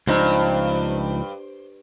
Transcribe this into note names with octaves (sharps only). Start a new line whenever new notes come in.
C#2 G2 F3 D#4 C5